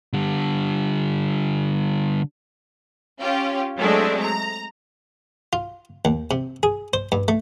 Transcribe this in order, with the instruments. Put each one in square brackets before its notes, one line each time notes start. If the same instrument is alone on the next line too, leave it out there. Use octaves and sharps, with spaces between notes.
[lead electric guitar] D3 G3
[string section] C#4 F4 G4
F#3 G#3 A3 C4 D4
A#5
[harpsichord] F4
D#2
C3
G#4
C5
G2
A3